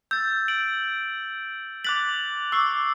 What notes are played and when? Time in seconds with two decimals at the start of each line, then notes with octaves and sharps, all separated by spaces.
0.11 E6 G6 A6
0.48 D7 F#7
1.84 D6 F#6 A6 B6 F#7
2.52 C#6 D6 E6 C7